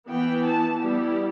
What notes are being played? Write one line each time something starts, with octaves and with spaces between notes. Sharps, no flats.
E3 B3 E4 G5
A5
G3 B3 E4 G4